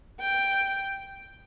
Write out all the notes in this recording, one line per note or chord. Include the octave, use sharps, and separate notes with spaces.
G5